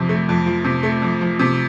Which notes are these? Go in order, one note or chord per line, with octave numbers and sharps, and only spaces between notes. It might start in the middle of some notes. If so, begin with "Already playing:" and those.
Already playing: F2 C3 F3
A3
F2
F3
C3
A3
F2
F3
C3